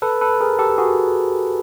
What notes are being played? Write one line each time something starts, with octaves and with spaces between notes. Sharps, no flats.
A4 B4
A4 B4
G#4 A#4
G4 A4
F#4 G#4